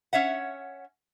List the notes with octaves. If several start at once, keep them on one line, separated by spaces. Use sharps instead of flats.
C#4 C#5 E5 F#5